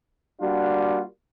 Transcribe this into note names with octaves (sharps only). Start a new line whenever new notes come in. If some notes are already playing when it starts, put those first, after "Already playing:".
G3 A#3 D4 F4 F#4